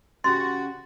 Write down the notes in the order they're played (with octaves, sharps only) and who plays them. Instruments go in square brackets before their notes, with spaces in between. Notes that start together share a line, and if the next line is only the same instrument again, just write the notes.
[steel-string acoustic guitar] C#3 C#4 G4 [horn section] F#4 [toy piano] C6 [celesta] A6